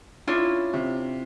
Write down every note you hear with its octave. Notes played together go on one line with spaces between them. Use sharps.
C#4 D4 E4 F4
C3